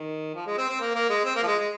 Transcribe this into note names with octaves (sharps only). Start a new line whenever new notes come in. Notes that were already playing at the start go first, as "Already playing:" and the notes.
Already playing: D#3
F3
G#3
C4
C4
A#3
A#3
G#3
C4
A#3
F3
G#3
G#3